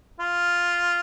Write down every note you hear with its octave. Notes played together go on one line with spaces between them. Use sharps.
F4